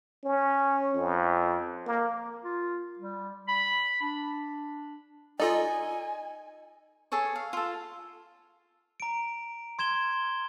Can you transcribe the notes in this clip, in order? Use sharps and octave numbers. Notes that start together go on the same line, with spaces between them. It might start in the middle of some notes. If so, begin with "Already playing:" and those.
C#4
F2
A#3
F4
G3
B5
D4
D#4 F4 A4 D5 D#5 G#5
G#4 A4 C#5 C#6
F5
F4 A4
A#5 D7
C6 G#6 E7 G7